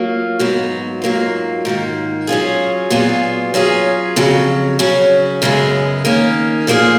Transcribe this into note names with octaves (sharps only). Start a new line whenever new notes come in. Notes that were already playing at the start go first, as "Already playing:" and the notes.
Already playing: F#3 A#3 F4
G#2 F#3 B3
G#2 F#3 A#3 F4
G#2 D#3 A#3 F4
F#3 C#4 F4 G#4
A#2 F#3 B3 F4 G#4
F#3 C#4 F4 G#4
F2 C#3 F#3
C#3 F#3 C#4
F#2 C#3 G#3 B3
D#3 A#3 C#4
A#2 F3 A#3 F4 G#4